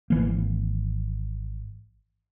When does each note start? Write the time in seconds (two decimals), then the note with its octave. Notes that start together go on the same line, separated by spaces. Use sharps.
0.10 G#1 E3 A#3